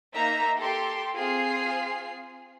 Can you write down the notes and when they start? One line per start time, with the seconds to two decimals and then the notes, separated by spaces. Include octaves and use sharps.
0.15 A#3 D#4 E5 A#5
0.59 G4 A4 C6
1.17 C4 F4 G#4 C7